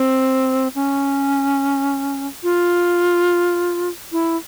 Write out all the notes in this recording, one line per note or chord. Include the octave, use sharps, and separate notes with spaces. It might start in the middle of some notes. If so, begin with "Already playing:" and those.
Already playing: C4
C#4
F4
E4